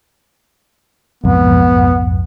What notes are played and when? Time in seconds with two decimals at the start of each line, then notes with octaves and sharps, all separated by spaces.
1.24 B1 F2 G#2 B3